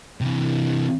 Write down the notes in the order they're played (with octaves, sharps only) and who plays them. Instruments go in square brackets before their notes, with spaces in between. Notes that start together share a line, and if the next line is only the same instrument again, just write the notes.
[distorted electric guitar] C3 E3